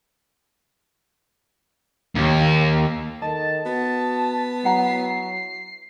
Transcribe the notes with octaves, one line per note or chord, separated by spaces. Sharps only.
D#2
D#3 A4 D#5 A5
B3 F#4
F#3 E4 F#5 A#5 C7